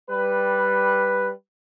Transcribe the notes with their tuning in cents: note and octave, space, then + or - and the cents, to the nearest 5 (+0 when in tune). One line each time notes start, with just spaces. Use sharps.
G3 +0 B4 +0